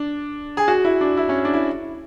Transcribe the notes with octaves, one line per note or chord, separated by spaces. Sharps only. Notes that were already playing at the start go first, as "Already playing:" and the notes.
Already playing: D4
G#4
F#4
E4
D4
E4
C#4
D4
E4